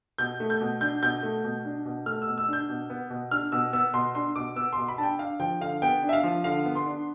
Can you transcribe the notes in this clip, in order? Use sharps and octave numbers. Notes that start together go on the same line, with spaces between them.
B2 G6
A3
G6
B2
D4 G6
B2 G6
A3
B2
D4
B2
A3 F6
E6
B2
E6
D4 G6
B2
B3
B2
D4 F6
B2 E6
B3 E6
B2 C6
D4 C6
B2 D6
B3 E6
B2 C6
B5
D4 A5
G5
D4 F5
F3 G5
D3 F5
B3 G5
D4
E5
F5
F3
D3 F5
B3
C6
D4